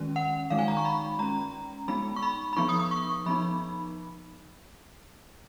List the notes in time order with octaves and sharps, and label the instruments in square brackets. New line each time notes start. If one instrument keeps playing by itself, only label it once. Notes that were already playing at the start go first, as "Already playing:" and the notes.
Already playing: [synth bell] D#3 G#3 C#4
F#5
D#3 G#3 D#4 F5
G#5
A#5
C#6
B5
G#3 C#4 A#5
G#3 B3 D#4 B5
C#6
B5
B5
F3 B3 D#4 C#6
D#6
D#6
C#6
F3 B3 D#4 B5